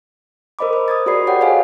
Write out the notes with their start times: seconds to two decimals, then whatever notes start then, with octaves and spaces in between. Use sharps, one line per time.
0.59 A#4 C5 D#5 B5 D6
0.73 C5
0.88 D#6 G#6 A6
1.06 F#4 G#4 A#4 D5 B5 C7
1.27 F#4 G4 C#5 F#5 G5
1.41 A4 C5 C#5 D#5 F5 G#5